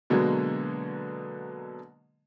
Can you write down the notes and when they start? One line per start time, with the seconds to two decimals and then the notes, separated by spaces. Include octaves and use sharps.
0.10 B2 D3 F#3 G#3 A#3 B3